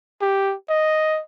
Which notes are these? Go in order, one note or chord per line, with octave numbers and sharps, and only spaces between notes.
G4
D#5